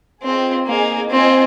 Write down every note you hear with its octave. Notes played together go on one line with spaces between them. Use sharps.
C4 F4 G#4 D#5 G5
A#3 D#4 G#4 D#5 G#5
C4 F4 C5 D#5 G#5